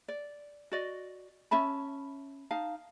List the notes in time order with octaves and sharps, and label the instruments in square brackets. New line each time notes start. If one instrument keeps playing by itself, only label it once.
[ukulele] D5
F#4 D5 D#5
C#4 E5 A5 B5
D#4 F5 A5